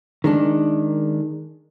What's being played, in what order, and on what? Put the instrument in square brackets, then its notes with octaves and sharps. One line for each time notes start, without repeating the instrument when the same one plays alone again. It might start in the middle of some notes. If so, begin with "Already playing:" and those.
[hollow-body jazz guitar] D#3 G#3 D4